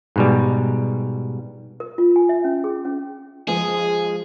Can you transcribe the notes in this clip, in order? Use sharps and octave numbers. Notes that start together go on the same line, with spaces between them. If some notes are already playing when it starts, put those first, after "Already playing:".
G#2 B2 G3
A#4
F4
G#5
E5
C#4
G#4
C#4
F3 G#3 G#4